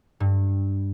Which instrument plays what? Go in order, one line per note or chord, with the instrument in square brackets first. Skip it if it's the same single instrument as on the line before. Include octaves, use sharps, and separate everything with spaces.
[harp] G2